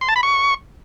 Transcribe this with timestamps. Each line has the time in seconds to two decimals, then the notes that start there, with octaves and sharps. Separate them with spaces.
0.01 C6
0.09 A5
0.16 B5
0.23 C#6